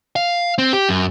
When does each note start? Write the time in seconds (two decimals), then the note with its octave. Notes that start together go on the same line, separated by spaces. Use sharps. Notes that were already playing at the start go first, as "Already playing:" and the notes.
0.16 F5
0.58 C4
0.73 G4
0.89 F#2